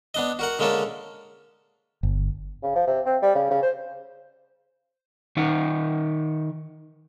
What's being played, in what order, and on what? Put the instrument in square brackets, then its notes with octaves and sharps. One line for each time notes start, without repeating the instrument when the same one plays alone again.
[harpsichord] B3 D4 D#5
F#4 A#4 F#5
D3 G#3 A#3 C#4 A4 A#4
[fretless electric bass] G1
[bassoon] C#3
F3
C3
C4
G3
C#3
C#3
C5
[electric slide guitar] D#3 D#4 E5 F#5